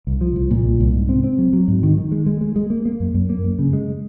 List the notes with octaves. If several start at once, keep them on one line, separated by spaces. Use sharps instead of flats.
C2
F3
C2
A#2
C2
C2
G#2
C4
C4
F#3
F#3
G#2
D#3
D#3
G#3
G#3
G#3
G#3
A#3
A#3
F#2
F#2
A#3
F#2
C#3
G#3